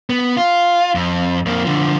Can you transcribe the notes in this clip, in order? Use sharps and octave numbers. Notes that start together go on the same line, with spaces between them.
B3
F4
F2
F2 A#3
D3 F3